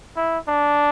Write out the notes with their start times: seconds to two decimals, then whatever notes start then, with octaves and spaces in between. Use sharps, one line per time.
0.17 E4
0.48 D4